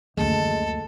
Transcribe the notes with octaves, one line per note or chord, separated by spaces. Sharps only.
F#1 D2 G#3 A4